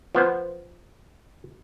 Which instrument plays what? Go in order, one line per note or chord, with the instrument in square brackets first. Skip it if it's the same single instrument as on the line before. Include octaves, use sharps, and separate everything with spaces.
[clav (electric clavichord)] F3 B3 C5